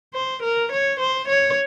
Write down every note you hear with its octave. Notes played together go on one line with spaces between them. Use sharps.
C5
A#4
C#5
C5
C#5